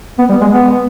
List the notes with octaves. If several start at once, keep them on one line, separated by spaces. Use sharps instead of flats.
B3
G3
G#3
B3